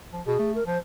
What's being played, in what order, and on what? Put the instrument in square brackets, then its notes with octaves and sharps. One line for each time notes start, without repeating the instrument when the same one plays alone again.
[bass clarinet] F3
[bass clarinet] B2 [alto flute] G#4
[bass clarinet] A3
[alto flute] A#4
[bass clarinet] F3 [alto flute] C5